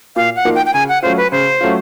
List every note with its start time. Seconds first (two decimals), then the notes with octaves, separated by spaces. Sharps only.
0.16 A#2 F5
0.36 F#5
0.45 F3 A#3 D#4
0.55 G5
0.66 G5
0.73 C#3 G#5
0.89 F#5
1.02 F#3 A3 C#4 F4 C5
1.17 B4
1.32 C#3 C5
1.61 F#3 A3 C#4 F4